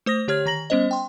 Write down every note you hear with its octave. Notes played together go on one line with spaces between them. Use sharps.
A3 C5 D#6 A#6
D3 G4 C#5 F6 G#6
D#3 A#5 A#6 F#7
G3 B3 C#4 C5 D#5
G5 C6